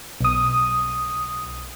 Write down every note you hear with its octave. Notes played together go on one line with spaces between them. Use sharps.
B1 D#6